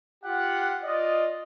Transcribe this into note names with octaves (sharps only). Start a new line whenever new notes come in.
F4 G4 F#5
F4 D5 D#5